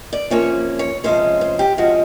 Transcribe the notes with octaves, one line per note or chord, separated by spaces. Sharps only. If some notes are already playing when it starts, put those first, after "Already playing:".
D5
C3 F3 A#3 C#4 C#5
C#5
C3 F3 G#3 C#4 C5
C5
G4
C3 F3 G#3 C#4 F#4